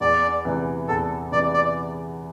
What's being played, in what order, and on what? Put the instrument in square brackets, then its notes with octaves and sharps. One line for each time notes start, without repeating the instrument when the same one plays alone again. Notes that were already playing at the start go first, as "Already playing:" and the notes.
[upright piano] E2 [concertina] D5
[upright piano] C3 E3
[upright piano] E2 [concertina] A4
[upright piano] C3 E3 [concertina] D5
[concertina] D5